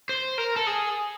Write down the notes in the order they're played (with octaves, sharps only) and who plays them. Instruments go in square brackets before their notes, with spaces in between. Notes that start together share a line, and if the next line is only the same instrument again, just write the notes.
[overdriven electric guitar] C5
A#4
A4
G#4